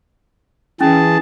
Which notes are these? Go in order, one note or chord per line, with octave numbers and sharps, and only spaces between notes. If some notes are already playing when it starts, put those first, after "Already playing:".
E3 C#4 G#4 A5